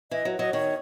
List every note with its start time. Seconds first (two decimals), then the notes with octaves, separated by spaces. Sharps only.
0.11 E3 D#5
0.25 F#3
0.39 F#3 D#5
0.53 D#3 C#5